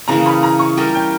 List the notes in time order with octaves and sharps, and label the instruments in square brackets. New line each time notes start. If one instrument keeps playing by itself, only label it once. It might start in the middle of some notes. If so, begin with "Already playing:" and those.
[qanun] C#3 E3 A#3 E4 [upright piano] A#5
[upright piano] B5
A#5
C#6
[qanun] G3 C#4 G4 A#4
[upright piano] G5